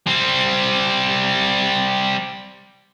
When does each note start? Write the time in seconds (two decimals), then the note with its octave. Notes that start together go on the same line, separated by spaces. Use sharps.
0.07 G3 C4